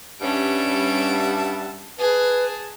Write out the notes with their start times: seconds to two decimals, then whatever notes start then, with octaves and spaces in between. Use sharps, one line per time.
0.21 G2 G3 C#4 E5 F#5 A5 D7
1.99 G#4 B4 A5